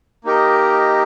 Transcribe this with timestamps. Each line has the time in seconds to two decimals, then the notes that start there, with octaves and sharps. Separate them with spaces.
0.24 A#3 D#4 G4 A#4 D#5